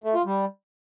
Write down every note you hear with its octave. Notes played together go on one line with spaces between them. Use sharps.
A3
F4
G3